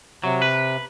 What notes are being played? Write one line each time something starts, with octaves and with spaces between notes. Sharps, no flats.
C3 F#3
B4